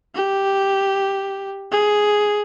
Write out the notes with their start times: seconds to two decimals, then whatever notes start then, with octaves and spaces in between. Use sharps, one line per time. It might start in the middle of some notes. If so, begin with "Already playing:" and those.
0.15 G4
1.71 G#4